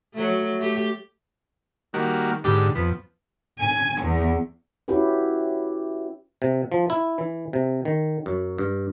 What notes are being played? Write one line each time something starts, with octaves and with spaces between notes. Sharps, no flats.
F#3 A3
A3 G4
D#3 G3 A#3 F#4
G#2 D3 G4
F2 B3
G#5
E2
C#4 E4 F#4 G4 B4
C3
F3
E4
E3
C3
D#3
F#2
G2